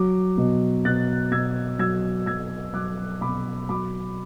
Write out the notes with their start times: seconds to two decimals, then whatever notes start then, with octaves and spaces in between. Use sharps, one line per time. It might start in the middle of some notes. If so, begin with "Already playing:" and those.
Already playing: F#3 D6
0.38 B2
0.85 B2 F#6 A6
1.31 B2 E6 G#6
1.79 F#3 E6 G#6
2.26 F#3 E6 G#6
2.74 F#3 D6 F#6
3.21 B2 B5 D6
3.69 F#3 B5 D6